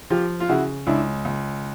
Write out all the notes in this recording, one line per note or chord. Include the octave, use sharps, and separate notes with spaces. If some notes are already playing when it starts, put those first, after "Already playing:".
F3 F4 G4
F4
C#3 E4 F#4
C#2 D4 E4
C#2